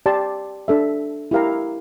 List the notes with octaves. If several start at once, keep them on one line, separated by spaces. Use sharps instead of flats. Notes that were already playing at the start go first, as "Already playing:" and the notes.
G4 D5 A5 C6
D4 A4 E5
E4 G4 A#4 F5 A#5